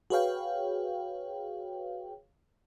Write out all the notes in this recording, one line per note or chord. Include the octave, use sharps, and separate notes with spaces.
F#4 G#4 B4 C#5 F5 G5